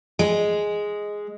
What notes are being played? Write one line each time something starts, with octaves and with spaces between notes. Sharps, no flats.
G#3